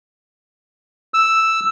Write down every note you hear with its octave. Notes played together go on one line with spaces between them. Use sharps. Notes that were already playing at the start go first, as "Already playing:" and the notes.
E6